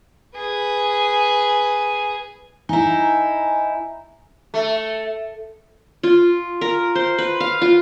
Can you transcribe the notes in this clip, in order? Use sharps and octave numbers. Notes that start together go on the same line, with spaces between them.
G#4 B4
D#4 E4 G#5 A#5
A3
F4
A#4
C5
B4
F5
F4